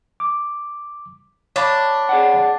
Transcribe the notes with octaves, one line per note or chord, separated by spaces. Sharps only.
D6
D4 C#5 F5 B5
G#4 D5 F#5